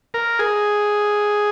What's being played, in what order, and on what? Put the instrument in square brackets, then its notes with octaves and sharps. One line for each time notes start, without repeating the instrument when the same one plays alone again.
[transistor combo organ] A#4
G#4